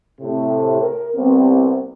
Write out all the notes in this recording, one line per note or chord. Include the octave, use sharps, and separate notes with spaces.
A2 C3
A#4
C2 B3 C4